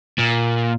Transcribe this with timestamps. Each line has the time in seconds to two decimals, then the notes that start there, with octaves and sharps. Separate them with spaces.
0.18 A#2